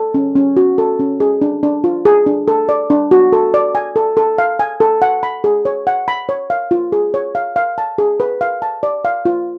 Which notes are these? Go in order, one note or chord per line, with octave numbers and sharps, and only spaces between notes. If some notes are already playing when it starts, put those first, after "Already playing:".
Already playing: A4
C#4
C#4
F#4
A4
C#4
G#4
D4
D4
F4
G#4
D4
A4
D5
D4
F#4
A4
D5
G#5
A4
A4
F5
G#5
A4
F#5
B5
G#4
C#5
F#5
B5
C#5
F5
F4
G#4
C#5
F5
F5
A5
G#4
B4
F5
A5
D5
F5
F4